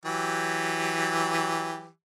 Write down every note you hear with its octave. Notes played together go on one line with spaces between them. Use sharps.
E3 F#3 G4